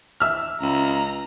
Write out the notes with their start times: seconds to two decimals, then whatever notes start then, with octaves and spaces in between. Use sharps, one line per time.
0.20 E5 E6 F6
0.62 C#2 A#5